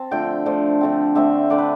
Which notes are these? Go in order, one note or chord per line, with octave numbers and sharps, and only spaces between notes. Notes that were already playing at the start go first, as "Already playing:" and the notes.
Already playing: C4 A5
D3 F3 A3 G5
D3 F3 A3
D3 A3 C4
D3 A3 C4 E5
D3 A3 D4 D5
B4